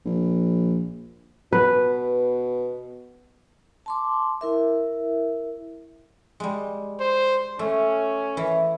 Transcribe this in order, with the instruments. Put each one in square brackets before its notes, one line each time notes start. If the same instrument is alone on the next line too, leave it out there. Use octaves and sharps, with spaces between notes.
[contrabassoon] A#1
[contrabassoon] B2 [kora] B4
[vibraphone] A5 C6 D6
E4 A#4 E5
[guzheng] G3 G#3
[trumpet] C5
[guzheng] A3 [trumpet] C#4
[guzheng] E3